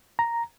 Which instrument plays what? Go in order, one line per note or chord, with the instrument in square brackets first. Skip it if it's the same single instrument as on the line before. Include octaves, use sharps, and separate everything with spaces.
[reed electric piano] A#5